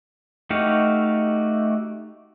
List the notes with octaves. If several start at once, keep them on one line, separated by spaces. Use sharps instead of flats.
A3 D#4 F#4 G4 F5